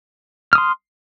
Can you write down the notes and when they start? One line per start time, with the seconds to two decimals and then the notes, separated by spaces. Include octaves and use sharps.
0.53 F6
0.55 D#6
0.58 C6